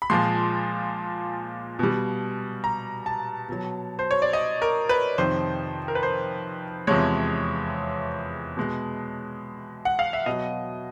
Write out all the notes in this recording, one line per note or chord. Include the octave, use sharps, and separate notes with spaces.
B5
A#2 F3 G#3 C6
B2 G3
A#5
A5
B2 F#3
C5
C#5
D5
D#5
A#4
B4
F2 C3 D#3 C5
A#4
B4
C5
E2 C3 F3 G#3 C#5
B2 G#3
F#5
F5
E5
B2 F#3 D#5